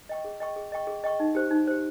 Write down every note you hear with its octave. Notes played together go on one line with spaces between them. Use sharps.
D#5 G5 C#6
G#4
D#5 G5 C#6
G#4
D#5 G5 C#6
G#4
D#5 G5 C#6
D#4
G4 C5
D#4
G4 C5